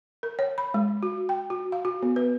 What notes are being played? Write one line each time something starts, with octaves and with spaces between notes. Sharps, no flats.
A#4
C#5
B5
G#3
F#4
G5
F#4
F5
F#4
B3
B4